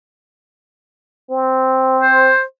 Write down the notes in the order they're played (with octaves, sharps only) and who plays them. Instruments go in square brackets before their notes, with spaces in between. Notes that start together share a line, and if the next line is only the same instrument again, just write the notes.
[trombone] C4
[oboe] C5